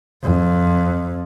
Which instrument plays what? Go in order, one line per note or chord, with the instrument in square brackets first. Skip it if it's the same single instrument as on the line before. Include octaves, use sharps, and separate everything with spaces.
[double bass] F2